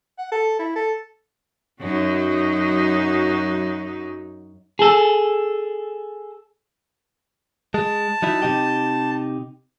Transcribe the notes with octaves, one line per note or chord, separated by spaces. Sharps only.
F#5
A4
E4
A4
F#2 F#3 D#4
G#4 A4
G#3 A5
F#3 D#4 E4
C3 D#4 G4